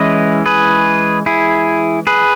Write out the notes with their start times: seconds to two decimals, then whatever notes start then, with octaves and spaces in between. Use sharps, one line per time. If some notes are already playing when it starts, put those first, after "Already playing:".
Already playing: E3 G#3 C#4 E4 B4 D#5
0.46 G#4 B4
1.26 E4 G#4
2.07 G#4 B4